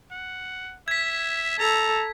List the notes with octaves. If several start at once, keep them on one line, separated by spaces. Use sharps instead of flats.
F#5
E5 G#6 B6
A4 A#5